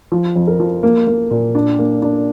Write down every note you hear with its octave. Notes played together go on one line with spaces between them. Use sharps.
F3
F2
A#4
F3
A#3
A#3
A#2
D4
A#3
D4